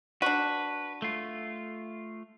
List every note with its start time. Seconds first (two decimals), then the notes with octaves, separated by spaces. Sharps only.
0.22 D4 F#4 B4
1.02 A3 F4